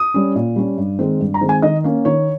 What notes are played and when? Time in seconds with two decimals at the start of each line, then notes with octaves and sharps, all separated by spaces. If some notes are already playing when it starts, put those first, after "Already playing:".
Already playing: D#6
0.14 G3 C#4
0.36 A#2
0.56 G3 C#4
0.78 G2
0.99 D#3 G#3 C4
1.20 G2
1.34 A#5
1.41 D#3 G#3 C4
1.49 G#5
1.62 D#3 D#5
1.84 A#3 C#4
2.05 D#3 C#5